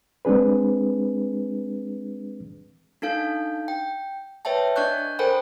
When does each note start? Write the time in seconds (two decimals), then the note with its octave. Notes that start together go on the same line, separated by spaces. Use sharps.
0.25 G#3 C4 D4 G#4 B4
3.02 D4 D#4 A4 F5 G6
3.68 G5
4.45 B4 C#5 E5 G5 A5
4.76 D4 D5 D#5 C#6 F#6 G6
5.19 A4 A#4 C5 G5 G#5 B5